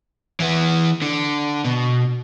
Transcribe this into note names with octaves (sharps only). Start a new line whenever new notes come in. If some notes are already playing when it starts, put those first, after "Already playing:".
E3 B3
D3
B2